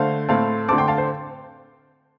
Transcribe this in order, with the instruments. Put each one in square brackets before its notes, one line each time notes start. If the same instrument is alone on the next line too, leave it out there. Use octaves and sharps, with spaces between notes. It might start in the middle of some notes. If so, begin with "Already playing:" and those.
Already playing: [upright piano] D3 A3 C5 F5
A2 A3 C4 F5 A5
D3 A3 C4 A5 D6
G5 C6
F5 A5
C5